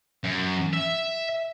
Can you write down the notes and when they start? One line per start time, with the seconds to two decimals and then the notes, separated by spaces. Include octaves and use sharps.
0.24 F#2
0.73 E5